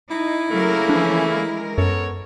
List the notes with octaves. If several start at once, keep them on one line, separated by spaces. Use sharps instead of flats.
D#4 E4
C#3 F#3 A3 A#3 A#4
E3 F3 C#4 D4
G#3 A#4
F#2 B3 A4 C#5